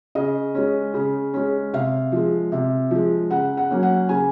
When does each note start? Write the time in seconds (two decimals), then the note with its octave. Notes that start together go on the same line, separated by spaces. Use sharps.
0.15 C#3 D#5
0.55 G#3 C#4
0.94 C#3
1.34 G#3 C#4
1.73 C3 F5
2.12 F3 G#3
2.52 C3
2.91 F3 G#3
3.31 C#3 F#5
3.57 F#5
3.71 F#3 A#3 C#4
3.83 F#5
4.09 C#3 G#5